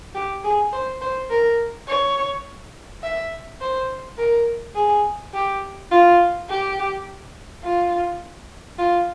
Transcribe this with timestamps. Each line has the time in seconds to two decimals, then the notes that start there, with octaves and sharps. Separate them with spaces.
0.15 G4
0.44 G#4
0.72 C5
1.01 C5
1.30 A#4
1.88 C#5
3.03 E5
3.61 C5
4.18 A#4
4.75 G#4
5.33 G4
5.91 F4
6.49 G4
7.64 F4
8.78 F4